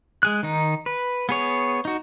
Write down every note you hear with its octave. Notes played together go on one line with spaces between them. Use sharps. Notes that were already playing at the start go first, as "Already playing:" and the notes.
G#3 G#4 F#6
D#3 D#4
B4
B3 G#4 C#5
D#4 F#4